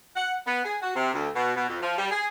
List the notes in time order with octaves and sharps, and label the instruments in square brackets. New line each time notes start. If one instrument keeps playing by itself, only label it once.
[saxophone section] F#5
B3
G#4
F#4
C3
D2
B2
B2
F2
F3
G3
G#4